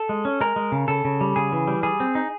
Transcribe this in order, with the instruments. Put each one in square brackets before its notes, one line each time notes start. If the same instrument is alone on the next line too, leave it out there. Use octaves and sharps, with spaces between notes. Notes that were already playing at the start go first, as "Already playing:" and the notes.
Already playing: [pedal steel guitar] A4
G#3
C#4
G#3 A#4
G#3
C#3
C#3 A4
C#3
G3
C#3 G#4
E3
G3
G3 G#4
C4
D#4